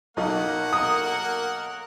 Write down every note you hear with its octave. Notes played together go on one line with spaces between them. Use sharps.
B1 A#3 D#4 F#5
A#4 D#6